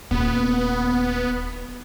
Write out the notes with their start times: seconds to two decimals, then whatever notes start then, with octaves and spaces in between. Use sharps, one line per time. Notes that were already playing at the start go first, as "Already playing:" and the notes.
0.11 D#1 B3